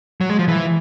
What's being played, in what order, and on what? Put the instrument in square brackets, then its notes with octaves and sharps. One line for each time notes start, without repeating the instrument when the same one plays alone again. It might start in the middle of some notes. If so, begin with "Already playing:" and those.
[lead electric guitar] F#3
G#3
F3
E3